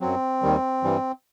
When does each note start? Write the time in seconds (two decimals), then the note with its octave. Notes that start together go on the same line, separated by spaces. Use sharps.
0.01 F#2 F#3 C4
0.42 D#2 D#3 G3
0.83 G2 E3 G3